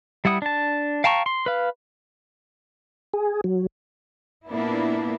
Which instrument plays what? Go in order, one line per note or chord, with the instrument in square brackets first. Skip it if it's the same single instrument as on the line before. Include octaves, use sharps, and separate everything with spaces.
[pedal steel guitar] G3 E4 F#5 D#6
D4 A5
F5 G5 A5 A#5 C#6
C6
B4 F5
[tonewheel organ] G#4
F#3
[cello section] A#2 A#3 B3 D4 E4